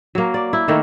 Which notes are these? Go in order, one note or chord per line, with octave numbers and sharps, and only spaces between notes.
F#3 A#3
D5
E4
D#3 A3 A#3